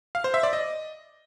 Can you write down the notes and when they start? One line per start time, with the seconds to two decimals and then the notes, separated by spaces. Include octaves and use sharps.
0.15 F5
0.24 C5
0.34 E5
0.43 D5
0.53 D#5